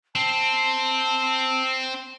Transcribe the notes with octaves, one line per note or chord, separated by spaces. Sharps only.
C4 A5